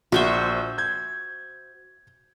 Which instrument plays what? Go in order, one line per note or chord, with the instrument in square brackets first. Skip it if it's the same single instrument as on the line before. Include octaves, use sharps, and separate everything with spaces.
[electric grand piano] A#1 [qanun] F#4 C5 E5
[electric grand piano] G6 G#6